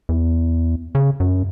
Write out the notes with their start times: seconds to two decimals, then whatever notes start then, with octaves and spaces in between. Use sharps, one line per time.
0.09 E2
0.95 C#3
1.20 F#2